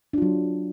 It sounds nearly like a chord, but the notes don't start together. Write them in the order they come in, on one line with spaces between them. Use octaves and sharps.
D4 F4 F#3